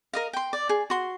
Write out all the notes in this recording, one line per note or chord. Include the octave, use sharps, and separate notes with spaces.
A#4 D#5 F5
G5 C6
D5
G#4
F#4 C6